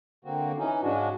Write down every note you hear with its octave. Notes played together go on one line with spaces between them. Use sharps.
D3 A#3 C4 F#4
E3 C#4 D#4
G#2 C#3 G#3 C#4 D4 F#4